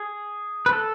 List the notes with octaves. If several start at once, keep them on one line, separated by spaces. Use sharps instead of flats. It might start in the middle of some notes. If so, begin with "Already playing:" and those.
Already playing: G#4
B4
A4